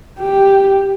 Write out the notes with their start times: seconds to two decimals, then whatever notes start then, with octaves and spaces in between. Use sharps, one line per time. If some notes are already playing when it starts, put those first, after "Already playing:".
0.20 G4